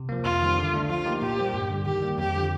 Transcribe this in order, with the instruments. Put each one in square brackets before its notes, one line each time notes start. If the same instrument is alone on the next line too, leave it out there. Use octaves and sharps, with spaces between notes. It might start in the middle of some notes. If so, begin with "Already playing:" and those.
Already playing: [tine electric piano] C3
F3 A#3
[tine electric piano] F2 [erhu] F4
[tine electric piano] D#3 G3 C4
D3
A3 D4 F4
[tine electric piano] F3 [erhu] F4
[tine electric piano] A#3 D#4 G4
[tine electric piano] A#2 [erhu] G4
[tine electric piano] G3 A#3 F4 C5
G2
D3 G3
[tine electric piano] D#3 [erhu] G4
[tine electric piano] G3 A#3
[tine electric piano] F2 [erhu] G4
[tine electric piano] D3 F3